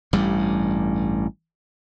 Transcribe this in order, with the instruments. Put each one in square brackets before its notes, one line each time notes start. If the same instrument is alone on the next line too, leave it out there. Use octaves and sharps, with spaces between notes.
[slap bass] A1 G2 G3